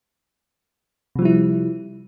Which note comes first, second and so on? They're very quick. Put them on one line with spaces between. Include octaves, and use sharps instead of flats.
C3 F3 G3 E4